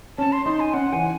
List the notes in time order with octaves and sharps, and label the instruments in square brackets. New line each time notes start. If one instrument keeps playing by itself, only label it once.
[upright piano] C#4 [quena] A5
[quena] C6
[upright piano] D#4 [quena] C6
[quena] G#5
[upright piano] C#4 [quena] F#5
[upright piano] E3 [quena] G#5